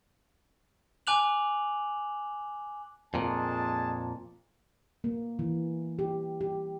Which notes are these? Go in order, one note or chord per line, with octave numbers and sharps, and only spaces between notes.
G#5 D6 F#6 F7 F#7
F2 A#2 G#3 A5
A#3
E3
G4
G4